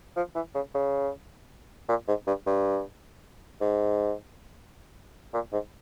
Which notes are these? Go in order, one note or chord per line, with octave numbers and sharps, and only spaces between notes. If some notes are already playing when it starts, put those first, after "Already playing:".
F3
E3
C#3
C#3
A#2
G#2
G2
G2
G#2
A#2
G#2